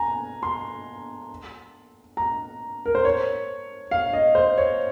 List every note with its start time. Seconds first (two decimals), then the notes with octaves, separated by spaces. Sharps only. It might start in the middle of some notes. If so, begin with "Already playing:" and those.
Already playing: G#5 A#5
0.43 C6
2.17 A#5
2.86 A#4
2.95 C5
3.05 C#5
3.91 F5
4.13 D#5
4.35 C5
4.58 C#5